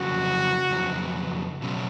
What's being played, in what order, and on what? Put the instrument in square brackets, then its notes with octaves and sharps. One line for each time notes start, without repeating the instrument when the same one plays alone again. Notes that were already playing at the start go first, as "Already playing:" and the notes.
Already playing: [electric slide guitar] F2 C#3 F#3 [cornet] F#4
[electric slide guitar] F2 C#3 F#3
B2 F#3 C#4